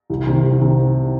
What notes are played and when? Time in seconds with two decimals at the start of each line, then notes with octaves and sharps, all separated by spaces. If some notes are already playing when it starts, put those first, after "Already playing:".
0.10 C2
0.27 C3 D#3
0.44 C2
0.61 C3 D#3